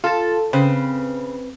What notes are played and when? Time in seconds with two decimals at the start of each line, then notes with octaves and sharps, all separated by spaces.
0.04 F4 A4 A5
0.53 C#3 C4 B4